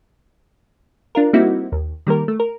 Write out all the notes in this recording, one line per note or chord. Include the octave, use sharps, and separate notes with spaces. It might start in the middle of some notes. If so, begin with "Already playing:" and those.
D4 F4 A#4
G3 A#3 C4 D#4 E4 F#4
D#2
D#3 G3 A#3 A#4
A3
A#4